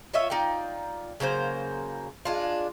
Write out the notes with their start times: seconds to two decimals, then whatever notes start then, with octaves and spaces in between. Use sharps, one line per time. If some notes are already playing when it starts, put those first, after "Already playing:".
0.13 F4 C#5 D#5 E5
0.30 D#4 F4 D5 G5
1.20 C#3 F#3 A#3 C5
2.25 G#3 D4 F4